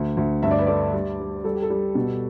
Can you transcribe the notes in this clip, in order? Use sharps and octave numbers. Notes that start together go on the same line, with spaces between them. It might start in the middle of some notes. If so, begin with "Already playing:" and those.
Already playing: D2
D2
G2 E5
D5
B4
A3 D5
G3
G3
G3 A4
G4
A4
G3
B2